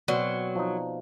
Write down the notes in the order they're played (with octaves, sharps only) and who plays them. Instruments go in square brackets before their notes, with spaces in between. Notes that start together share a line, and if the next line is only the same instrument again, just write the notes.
[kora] B2 C4 [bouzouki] F#3 [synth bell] D5
[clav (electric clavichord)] F3 D#4